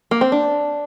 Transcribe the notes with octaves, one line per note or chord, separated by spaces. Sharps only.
A#3
C4
D4